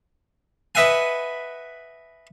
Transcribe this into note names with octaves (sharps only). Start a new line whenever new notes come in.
B4 D#5 E5 F#5 G#5